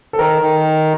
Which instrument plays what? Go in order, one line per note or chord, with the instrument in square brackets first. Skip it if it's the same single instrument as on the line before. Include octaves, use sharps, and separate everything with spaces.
[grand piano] A4
[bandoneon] D#3 [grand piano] A#4
[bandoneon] D#3